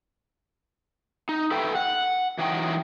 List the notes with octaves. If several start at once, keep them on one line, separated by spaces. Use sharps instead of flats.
D#4
A4 B4 E5 G5
F#5
E3 F#3 D#4 G5